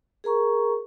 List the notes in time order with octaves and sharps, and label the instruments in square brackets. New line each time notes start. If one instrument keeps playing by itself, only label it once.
[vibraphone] G#4 A#4 A#5 C#6